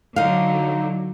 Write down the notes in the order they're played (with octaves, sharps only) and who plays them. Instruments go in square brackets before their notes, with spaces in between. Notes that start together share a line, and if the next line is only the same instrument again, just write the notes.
[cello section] D3 F#3 [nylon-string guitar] D#4 F5